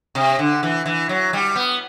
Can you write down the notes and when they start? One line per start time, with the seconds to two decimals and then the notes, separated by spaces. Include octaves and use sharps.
0.15 C3
0.39 D3
0.63 E3
0.86 E3
1.09 F#3
1.33 G3
1.56 B3